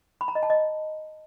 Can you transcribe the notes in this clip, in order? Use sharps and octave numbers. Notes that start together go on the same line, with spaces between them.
B5
A#5
D#5
A5
D#5